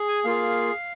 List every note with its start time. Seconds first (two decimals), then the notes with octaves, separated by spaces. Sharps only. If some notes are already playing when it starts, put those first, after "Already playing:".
Already playing: G#4
0.08 G#5
0.25 A#3 F4 G#4 F5